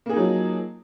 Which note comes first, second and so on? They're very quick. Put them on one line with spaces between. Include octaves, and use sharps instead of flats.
A#3 G#4 D#4 F#3 F3